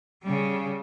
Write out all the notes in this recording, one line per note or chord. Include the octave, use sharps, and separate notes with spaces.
C#3 G3